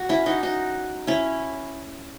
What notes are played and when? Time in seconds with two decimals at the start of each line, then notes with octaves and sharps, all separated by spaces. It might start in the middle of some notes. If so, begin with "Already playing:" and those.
Already playing: F#4
0.09 C#4 E4
0.26 D#4 F#4
0.43 D#4 F#4
1.07 C#4 E4